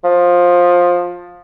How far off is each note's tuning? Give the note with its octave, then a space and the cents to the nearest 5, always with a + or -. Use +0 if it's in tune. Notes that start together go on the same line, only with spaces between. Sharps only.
F3 +15